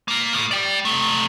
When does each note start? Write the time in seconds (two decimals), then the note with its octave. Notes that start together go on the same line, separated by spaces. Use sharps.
0.08 A#3 F4
0.34 A2
0.51 D5 G5
0.85 C3 A3